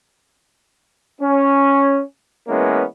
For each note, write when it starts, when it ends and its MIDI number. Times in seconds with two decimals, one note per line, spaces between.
1.20 1.99 61
2.47 2.83 52
2.47 2.83 56
2.47 2.83 58
2.47 2.83 59
2.47 2.83 61